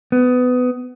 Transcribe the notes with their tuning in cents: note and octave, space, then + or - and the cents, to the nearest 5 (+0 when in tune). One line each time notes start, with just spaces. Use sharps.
B3 +20